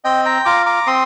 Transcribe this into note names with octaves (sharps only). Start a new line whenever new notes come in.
C4 D#5 G5
G5 A#5
F4 A#5 D6
A#5 D6
C4 C6 D#6